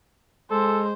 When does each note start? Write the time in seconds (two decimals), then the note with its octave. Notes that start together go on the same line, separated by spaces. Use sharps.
0.51 G#3 A4 C5